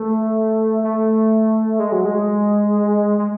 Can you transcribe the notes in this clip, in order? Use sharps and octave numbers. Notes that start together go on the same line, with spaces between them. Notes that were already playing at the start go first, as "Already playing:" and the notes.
Already playing: A3
A3
G#3
F#3
G#3
G#3